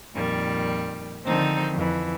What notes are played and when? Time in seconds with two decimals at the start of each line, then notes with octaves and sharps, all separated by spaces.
0.13 F2 A#2 D#3 G3
1.24 D3 D#3 F3 C4 D#4 C5
1.73 F2 E3